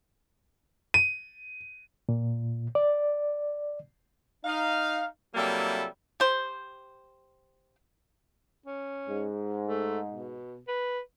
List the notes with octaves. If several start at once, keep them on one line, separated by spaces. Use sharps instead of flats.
D#7
A#2
D5
D#4 F5
C3 F#3 G3 A#3 E4 A4
G4 C5
C#4
G#2
A3
B2
B4